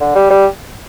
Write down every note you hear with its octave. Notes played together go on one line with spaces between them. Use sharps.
D3
G3
G3